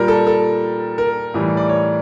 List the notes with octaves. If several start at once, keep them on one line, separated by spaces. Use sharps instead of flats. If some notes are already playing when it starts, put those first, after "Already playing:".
Already playing: A#2 G3 A#4
A4
A4
A#4
A2 E3 G3
D5
C#5